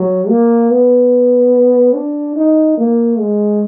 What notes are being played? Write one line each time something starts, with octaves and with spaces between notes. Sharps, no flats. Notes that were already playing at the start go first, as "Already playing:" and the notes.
Already playing: F#3
A#3
B3
D4
D#4
A#3
G#3